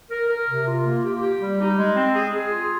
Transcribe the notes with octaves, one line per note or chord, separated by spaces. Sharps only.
A#4
A#4
C3
F4
A#3
G4
G4
G3
D#4
G#3
C4
G#4
G#4
F4